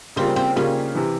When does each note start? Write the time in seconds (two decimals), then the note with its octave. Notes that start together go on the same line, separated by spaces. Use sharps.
0.16 C#3 G3 A#3 C4 F4
0.36 C4
0.56 C#3 G3 A#3 C#4 F4
0.95 C3 E3